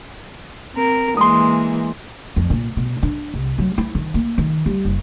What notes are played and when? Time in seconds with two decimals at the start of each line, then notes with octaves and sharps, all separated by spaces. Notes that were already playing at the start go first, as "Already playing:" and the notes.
0.74 C4 A#4
1.17 E3 G#3 A#3 C6 D#6
2.36 F2
2.50 A#2
2.77 B2
3.03 D4
3.34 C2
3.58 F#3
3.78 E4
3.95 D#3
4.14 A#3
4.38 D#3
4.66 G3
4.85 F#1